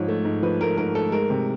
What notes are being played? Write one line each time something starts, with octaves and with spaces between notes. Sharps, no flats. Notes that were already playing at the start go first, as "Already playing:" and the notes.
Already playing: G#2 F3 C#5
A3
G#2
F3 B4
A3 A#4
G#2 A#4
A3 A4
G#3 A#4
C3